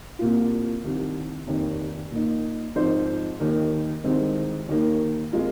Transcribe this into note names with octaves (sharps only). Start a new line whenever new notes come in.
C2 A#2 A#3 F4
C2 C3 D#3
F1 D#2 D#3
A#2 A#3 D#4
G#2 F3 C4 D#4 C5
D#2 D#3 A#3 D#4 A#4
C2 C3 D#3 G#3 C4
D#2 D#3 A#3
C3 G#3 F4 A#4